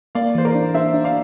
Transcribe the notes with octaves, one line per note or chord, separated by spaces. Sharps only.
A#3 D5 F5
E3 C5
A#4 D5
D4
D4 C5 E5
D4
D5 F5